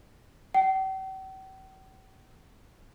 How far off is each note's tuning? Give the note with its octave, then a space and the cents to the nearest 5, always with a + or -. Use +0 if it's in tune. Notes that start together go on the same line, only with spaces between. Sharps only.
G5 -45